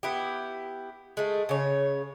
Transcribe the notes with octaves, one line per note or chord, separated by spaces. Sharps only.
B3 E4 G4
G#3 A3
C#3 C#5